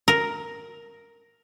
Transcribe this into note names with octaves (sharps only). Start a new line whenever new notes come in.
A#4